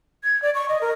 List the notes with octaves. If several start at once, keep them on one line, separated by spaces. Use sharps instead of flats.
G#6
D5
C#6
D#5
A#4